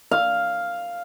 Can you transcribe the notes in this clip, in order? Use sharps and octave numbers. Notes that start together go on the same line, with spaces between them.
F5